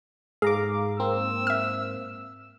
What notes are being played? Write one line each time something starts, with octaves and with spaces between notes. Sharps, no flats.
G#2 G#4 F5 A#5 D6
A#3 C4 E6
E5 F6